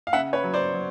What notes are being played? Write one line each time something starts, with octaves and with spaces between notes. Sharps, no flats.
F5
C#3 E5 F#5
B4 C#5
F#3
C5 D5
F#3